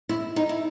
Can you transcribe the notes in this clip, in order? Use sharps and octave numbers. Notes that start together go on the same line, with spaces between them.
E4
D#4
E4